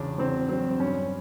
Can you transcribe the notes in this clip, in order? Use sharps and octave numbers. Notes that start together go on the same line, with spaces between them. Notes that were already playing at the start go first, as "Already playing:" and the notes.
Already playing: E2 C#3 D4
E2 C4
F#3 C4
G2 C#4